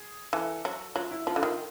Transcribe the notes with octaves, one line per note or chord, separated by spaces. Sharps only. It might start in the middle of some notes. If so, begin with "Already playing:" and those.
Already playing: G#4
E3 A4
F#3
F#3 F4
E4
F3 F4
D3
D#3 F4